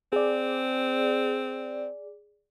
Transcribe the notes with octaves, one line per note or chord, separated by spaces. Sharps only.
C4 G#4 D5